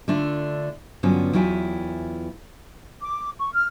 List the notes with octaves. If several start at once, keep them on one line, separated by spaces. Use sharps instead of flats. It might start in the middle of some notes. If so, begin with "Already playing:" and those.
D3 A3 D4 F4
G2 D3 F#3 B3 C#4 F4
E2 F#3 E4 F4 G5 G#5
D6
C#6
F6